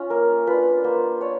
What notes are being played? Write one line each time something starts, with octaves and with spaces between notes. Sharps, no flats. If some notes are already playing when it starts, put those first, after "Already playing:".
Already playing: C#4 F4
A#3 A#4
D4 F4 B4
A#3 C5
D4 C#5